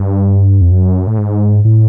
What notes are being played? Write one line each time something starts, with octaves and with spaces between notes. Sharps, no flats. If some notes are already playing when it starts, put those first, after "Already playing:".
Already playing: G2
F2
F#2
A2
G#2
A2